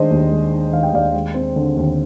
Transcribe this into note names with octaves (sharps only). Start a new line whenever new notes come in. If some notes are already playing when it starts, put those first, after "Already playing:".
Already playing: D#3 G#3 D4 C5 D#5
D#2
G#3
D4
D#3 F5
G5
D#2 D5 F5
G#3
C4
D3
D#2